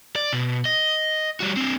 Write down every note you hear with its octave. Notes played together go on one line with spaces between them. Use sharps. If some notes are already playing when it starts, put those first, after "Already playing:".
D5
B2
D#5
G3 F#4
C4 D4